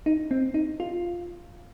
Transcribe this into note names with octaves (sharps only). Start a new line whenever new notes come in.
D#4
C4
D#4
F4